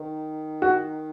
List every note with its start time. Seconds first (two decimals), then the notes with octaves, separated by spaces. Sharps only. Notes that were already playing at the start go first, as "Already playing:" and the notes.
Already playing: D#3
0.62 F#4